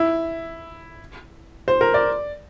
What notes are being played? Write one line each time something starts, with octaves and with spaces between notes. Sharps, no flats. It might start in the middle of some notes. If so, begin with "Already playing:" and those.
Already playing: E4
C5
A#4
D5